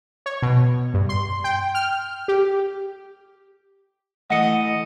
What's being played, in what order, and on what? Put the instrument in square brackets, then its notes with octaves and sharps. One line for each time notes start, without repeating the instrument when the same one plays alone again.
[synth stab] C#5
B2
G2
C6
G5
F6
G4
[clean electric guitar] E3 A3 [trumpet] D#5 [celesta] F#5 C#7